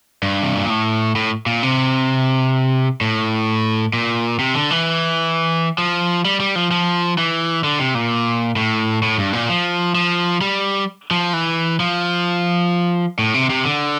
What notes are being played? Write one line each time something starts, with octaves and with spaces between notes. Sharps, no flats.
G2
C3
A#2
A2
A2
A#2
C3
A2
A#2
C3
D3
E3
F3
G3
G3
F3
F3
E3
D3
C3
A#2
A2
A2
G2
A#2
F3
F3
G3
F3
E3
F3
A2
C3
C3
D3